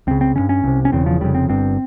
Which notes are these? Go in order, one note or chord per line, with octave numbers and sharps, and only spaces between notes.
C#2 C#3 C4
C4
G1 G2 C#4
C#4
C2 C3
C#4
E1 E2 C#3 C4
F3
F1 F2 C#3 G3
C4
G1 G2 C4